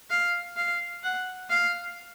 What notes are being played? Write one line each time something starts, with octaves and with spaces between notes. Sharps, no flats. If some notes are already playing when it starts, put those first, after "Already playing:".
F5
F5
F#5
F5